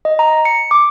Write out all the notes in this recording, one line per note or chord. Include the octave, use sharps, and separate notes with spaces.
D#5
A#5
C#7
D6